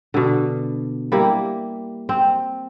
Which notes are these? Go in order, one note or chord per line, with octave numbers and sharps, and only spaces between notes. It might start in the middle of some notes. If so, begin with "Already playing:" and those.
B2 D3
G3 A#3 E4
C4